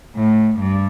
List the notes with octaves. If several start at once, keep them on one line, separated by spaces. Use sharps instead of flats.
A2
G2